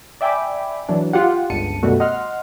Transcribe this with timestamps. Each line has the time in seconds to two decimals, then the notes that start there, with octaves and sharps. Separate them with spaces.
0.21 D5 E5 G5 G#5 B5 D6
0.89 E3 F#3 D4
1.13 F4 G4 F#5
1.50 G1 C#2 A5 C#7 D#7
1.83 F#2 B2 G3 A3 B3 F#4
2.00 D#5 F#5 C6 F6